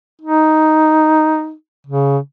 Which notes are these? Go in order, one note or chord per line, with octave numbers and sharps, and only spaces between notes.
D#4
C#3